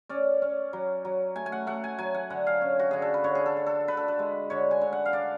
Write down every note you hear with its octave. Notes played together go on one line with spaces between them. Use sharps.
C#4 D5
C#4
F#3
F#3
A3 G#5
G#5
F#5
A3 F#5
G#5
F#3 G#5
F#5
D3 F#5
F5
C#4
F#4
D3 G#4
A4
B4
D3 C#5
G#4
A4
D3
A4
D3 B4
A4
B4
G#3
D3 C#5
G#5
D3
F#5
F5
D4 D5